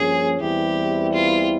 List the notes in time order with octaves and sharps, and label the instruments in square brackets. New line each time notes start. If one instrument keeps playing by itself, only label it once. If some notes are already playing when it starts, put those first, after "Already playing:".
Already playing: [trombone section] G2 F3 A#3 C#4 [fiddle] G#4
[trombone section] E2 E3 G3 C4 E4 [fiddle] G4
[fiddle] F4